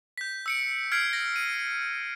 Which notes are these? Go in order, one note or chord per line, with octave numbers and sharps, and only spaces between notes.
G6 B6
E6 C#7 D7
F6 G#6 C7 D7
A#6
D#7